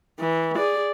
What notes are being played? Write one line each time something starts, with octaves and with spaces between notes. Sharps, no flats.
E3
G#4 D5